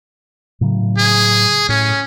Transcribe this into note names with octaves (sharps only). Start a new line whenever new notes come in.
A2 C#3 F#3
G#4
A2 C#4